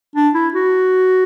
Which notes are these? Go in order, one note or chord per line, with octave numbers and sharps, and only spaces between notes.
D4
E4
F#4